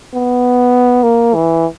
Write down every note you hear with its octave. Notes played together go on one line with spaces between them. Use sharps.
B3
A#3
E3